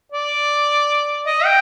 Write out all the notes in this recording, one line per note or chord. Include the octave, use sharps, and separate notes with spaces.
D5
D#5
G5